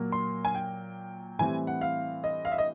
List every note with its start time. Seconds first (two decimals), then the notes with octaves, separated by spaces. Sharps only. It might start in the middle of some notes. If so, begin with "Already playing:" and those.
Already playing: A#2 F#3 A#3
0.12 C6
0.45 G#5
0.55 G5
1.39 A2 E3 G3 C4 G#5
1.67 F#5
1.81 F5
2.24 D#5
2.45 F5
2.52 E5
2.58 D#5